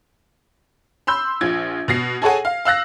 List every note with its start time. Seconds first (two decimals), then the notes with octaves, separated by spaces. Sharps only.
1.07 B5 C6 E6 G6
1.41 A#1 F4 G#6
1.88 B2 A#6 C7
2.22 G#4 A4 C#5 F#5 G#5
2.45 F5
2.65 F5 E6 F#6 A#6